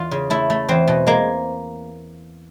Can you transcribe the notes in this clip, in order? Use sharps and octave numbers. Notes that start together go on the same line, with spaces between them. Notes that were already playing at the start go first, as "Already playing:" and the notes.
Already playing: E2 F4
C#3
A3 E4
A3
E2 C4
B2
G#3 A#3